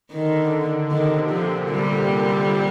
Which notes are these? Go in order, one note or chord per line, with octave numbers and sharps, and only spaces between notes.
D3 D#3
C3 D#3
A#2 F3
G3